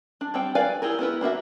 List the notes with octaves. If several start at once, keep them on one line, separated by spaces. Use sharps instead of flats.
D4
G3 C4 G5
A#4 B4 D5 F5 G#5
E4 G4 G#4 A#4
B3 E4 A#4 B4
A#3 D4 F#4 E5